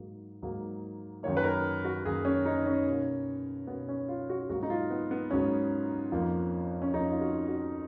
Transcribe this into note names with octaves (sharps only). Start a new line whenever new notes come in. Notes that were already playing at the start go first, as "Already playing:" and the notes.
Already playing: G#2 F#3 A#3
G#2 F#3 A#3
F#2 D#3 A#3 C#5
B4
A#4
F#4
F#2 D#3 A#3 G#4
C#4
D#4
C#4
B2 A#3
B2 A#3 B3
C#4
F4
F#4
G#2 F#3 A#3 F#4
D#4
F4
B3
B3
G#2 F#3 A#3 C#4
F2 F3 A#3
C#4
F2 F3 A#3 D#4
F4
F#4
F#4